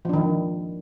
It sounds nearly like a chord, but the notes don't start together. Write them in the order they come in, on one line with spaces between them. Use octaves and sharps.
F3 D4 D#3